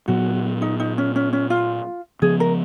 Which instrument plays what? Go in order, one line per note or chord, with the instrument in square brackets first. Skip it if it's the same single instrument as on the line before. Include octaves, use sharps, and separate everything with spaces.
[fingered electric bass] A#2 F#3 B3 [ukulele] F#4
[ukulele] D#4
D#4
C#4
C#4
C#4
F4
[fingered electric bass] C#3 F3 B3 [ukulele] G#4
[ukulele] A#4